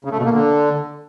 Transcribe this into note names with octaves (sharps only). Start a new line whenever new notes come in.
C#3
A3
B2
A#3
D3